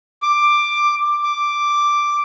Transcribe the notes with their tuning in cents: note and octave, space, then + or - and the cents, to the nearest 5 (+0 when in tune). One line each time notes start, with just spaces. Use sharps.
D6 +10
D6 +0